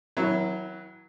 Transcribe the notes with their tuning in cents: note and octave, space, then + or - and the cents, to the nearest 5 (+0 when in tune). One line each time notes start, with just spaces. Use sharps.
D#3 +45 F#3 +0 E4 -10